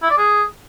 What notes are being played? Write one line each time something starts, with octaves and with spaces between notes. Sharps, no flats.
E4
D5
G#4